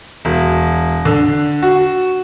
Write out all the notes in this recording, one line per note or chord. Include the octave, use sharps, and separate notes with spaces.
E1
D3
F#4